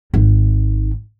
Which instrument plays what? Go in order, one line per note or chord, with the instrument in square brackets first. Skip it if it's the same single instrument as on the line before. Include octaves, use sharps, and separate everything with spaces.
[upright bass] G#1 D#3